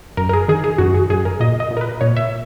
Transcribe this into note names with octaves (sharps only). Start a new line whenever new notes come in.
F#2 A#4
A#4
G#4
D#3 G#4
G#4
F#2 F#4
G#4
F#2 G#4
A#4
A#2 D#5
D#5
A#2
A#4
B4
A#2 C#5
E5